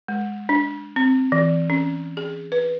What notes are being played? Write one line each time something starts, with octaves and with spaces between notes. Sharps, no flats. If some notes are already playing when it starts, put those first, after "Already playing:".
G#3
D4
C4
E3
C#4
G#4
B4